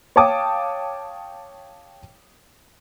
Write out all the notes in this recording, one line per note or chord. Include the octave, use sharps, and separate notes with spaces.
C#5 F5 G5 A5 D6 D#6